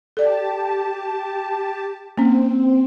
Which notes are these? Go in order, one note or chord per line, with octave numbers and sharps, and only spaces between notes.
G4 A4 D5 A5
A#3 C4 C#4